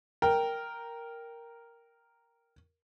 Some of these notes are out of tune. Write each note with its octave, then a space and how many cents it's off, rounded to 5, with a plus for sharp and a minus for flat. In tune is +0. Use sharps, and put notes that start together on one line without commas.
A#4 +0 G5 +0